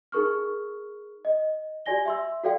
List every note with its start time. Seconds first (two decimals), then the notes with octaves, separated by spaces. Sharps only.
0.12 D#4 G#4 A#4 C#6 F6
1.25 D#5
1.86 F#4 G4 D5 G#5 A#6 G7
2.06 E5 C6 E6
2.44 F#4 A4 D5 F5 G5